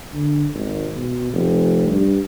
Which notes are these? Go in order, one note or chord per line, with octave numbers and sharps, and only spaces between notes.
D3
G#1
B2
F1
G2